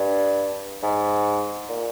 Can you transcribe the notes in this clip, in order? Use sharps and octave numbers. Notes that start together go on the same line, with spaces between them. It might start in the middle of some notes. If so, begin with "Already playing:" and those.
Already playing: G2
G#2
A#2